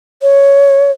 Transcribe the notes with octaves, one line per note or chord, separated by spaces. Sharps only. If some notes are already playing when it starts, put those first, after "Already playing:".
C#5